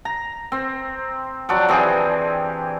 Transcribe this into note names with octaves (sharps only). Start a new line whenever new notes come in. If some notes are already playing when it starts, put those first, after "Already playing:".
A#5
C4
F3 F#3 D4
E3 C4 G4 G#4